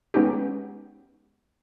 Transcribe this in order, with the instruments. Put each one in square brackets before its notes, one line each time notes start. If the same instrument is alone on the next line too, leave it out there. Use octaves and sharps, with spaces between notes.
[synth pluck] G#3 B3 C#4 D#4 G4